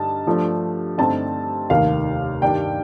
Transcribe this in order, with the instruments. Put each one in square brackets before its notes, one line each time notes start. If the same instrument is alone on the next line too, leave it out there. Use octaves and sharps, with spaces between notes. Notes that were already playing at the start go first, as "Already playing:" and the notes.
Already playing: [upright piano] G2 D3 G3 D#4 A5
G2 F3 A3 D4
G2 D3 A3 C4 D#4 A5
F1 D#2 D#3 A#3 F5
G2 D#3 G3 D4 G5